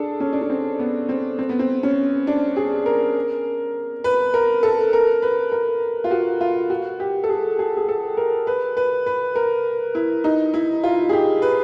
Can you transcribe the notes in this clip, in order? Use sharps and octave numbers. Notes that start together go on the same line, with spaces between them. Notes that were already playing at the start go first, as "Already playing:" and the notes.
Already playing: D4 G#4 A4
C#4
D4
C#4
C4
B3
C4
C4
B3
C4
C#4
D4
G#4
A#4
B4
A#4
A4
A#4
B4
A#4
F4
F#4
F4
F#4
G4
A4
G#4
G#4
G#4
A4
A#4
B4
B4
B4
A#4
E4
D#4
E4
F4
G#4
G4
B4